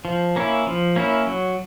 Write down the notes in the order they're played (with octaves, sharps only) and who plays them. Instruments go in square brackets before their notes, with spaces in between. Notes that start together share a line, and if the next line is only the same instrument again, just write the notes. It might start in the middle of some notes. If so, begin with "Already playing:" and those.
[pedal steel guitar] F3
A#3 C#4 E4
F3
A#3 C#4 E4
F#3